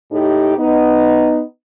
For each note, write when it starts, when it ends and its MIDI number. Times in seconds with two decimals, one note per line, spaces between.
0.11 0.57 45
0.11 0.57 63
0.11 0.57 67
0.58 1.43 59
0.58 1.43 63